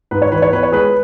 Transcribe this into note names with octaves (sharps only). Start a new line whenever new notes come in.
G#2 B4
C#5
E3 B4
C#5
B3 B4
C#5
G#3 G#4 B4